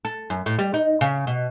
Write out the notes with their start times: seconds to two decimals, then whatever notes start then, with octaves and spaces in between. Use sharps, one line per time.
0.05 A4
0.30 F#2
0.46 A2
0.59 G3
0.74 D#4
1.01 C#3
1.27 B2